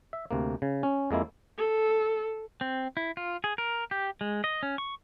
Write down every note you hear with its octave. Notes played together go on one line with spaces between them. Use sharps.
E5
D2 C3 A#3
C#3
C#4
F2 G#3 A#3 E4
A4
C4
E4
F4
G#4
A#4
G4
G#3
D#5
C#4
C#6